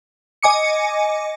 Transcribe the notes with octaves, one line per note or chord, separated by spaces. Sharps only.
D#5 G#5 D6 C#7